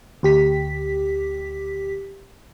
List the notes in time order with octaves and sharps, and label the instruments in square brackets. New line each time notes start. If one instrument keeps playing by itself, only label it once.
[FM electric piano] D2 G4 B6